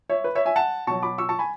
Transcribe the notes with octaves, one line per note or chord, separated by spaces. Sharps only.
C#5 E5
B4
C#5 E5
E5 G#5
F#5 A5
B2 F#3 A5 C#6
B5 D6
C#6 E6
A5 C#6
G#5 B5